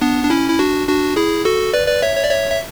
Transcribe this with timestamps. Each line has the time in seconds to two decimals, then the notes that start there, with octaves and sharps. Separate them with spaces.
0.02 B3 D4
0.24 D4
0.30 C#4 E4
0.50 E4
0.59 D4 F#4
0.87 D4 F#4
1.16 E4 G#4
1.45 F#4 A4
1.73 B4 D5
1.88 B4 D5
2.02 C#5 E5
2.16 C#5
2.24 D5
2.31 C#5 E5
2.51 E5